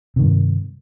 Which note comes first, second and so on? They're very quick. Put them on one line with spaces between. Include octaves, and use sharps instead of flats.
C3 D#3 G2